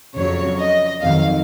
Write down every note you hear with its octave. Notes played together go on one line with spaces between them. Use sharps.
F2 C#3 F#3 C#5
D#5
F2 D#3 F#3 F5